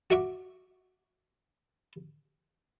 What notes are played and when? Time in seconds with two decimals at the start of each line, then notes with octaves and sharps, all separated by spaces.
0.10 F#4 E5 D6